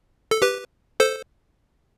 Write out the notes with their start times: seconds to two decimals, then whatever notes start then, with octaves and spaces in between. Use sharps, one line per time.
0.31 A4
0.42 G4 B4
1.00 A4 C5